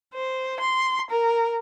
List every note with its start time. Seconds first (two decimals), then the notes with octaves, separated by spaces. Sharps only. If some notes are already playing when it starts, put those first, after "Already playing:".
0.14 C5
0.60 C6
1.10 A#4